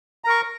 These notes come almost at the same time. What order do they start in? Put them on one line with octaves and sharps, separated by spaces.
A#5 A#4 C#6